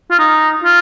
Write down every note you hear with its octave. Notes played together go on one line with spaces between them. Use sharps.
F4
D#4
F4